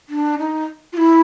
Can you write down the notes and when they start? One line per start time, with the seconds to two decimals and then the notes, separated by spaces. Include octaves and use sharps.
0.09 D4
0.38 D#4
0.93 F4
0.97 E4